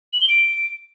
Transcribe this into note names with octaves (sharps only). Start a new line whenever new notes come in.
F#7
G7
D7